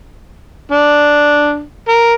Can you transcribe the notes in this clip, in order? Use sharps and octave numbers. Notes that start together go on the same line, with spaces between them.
D4
A#4